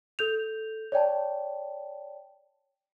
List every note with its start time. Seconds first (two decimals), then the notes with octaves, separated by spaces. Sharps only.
0.19 A4 G6 F7
0.92 C#5 D5 G5 A5